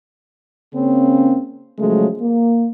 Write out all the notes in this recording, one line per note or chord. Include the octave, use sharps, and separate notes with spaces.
C#3 A#3 C4 C#4
C#3 F3 F#3 G#3 A3
A#3